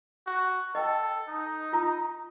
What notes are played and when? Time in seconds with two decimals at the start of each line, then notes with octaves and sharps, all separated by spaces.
0.27 F#4
0.75 A4 D#5 G5
1.29 D#4
1.73 F4 A#5